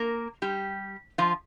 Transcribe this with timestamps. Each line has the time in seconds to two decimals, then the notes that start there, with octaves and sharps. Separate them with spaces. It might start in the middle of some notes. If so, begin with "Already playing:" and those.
Already playing: A#3 A#4
0.42 G3 G4
1.18 F3 F4